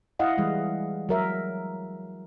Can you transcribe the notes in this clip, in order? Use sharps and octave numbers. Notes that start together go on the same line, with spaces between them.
E4 D#5 F5 F#5
E3 G3 G#3
F#3 A#4 E5